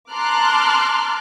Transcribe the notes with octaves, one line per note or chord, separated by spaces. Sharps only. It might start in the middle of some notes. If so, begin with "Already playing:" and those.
A5 A#5 C6 D6 F6 F#6